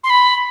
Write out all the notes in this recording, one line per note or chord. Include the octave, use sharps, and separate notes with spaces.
C6
B5